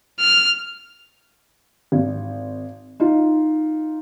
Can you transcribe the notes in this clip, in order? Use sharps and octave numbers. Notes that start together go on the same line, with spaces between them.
F6
G#1
D#4 F4